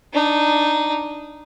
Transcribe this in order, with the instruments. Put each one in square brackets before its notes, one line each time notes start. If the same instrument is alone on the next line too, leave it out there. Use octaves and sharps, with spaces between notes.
[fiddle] D4 D#4